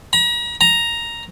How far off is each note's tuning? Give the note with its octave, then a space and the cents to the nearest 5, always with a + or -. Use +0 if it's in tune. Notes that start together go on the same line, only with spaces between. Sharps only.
A#5 +40
A#5 +5